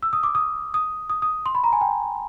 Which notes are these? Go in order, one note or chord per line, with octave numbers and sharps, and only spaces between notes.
E6
D#6
D6
D#6
D#6
D#6
D#6
C6
B5
A#5
G#5
G5